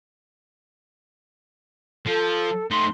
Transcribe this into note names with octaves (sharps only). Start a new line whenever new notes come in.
F3 A4
A3 D#4 C6